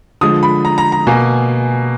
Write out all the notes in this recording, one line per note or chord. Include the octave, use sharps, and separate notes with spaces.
D3 F3 G#3 D#6
B5
A#5
A#5
A#5
B2 A#3 G#5